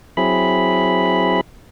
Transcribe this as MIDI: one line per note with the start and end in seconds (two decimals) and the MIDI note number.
0.17 1.41 54
0.17 1.41 60
0.17 1.41 64
0.17 1.41 68
0.17 1.41 83